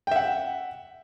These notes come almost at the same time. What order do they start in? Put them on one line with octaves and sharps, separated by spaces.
G5 E5 F#5